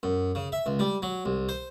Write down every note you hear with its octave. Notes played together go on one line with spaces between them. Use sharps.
F#2
C#3
E5
C#2
G3
F#3
C2
C5